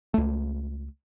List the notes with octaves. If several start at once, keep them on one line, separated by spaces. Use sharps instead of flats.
C#2 A3